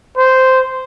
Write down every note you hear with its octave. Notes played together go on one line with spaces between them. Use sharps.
C5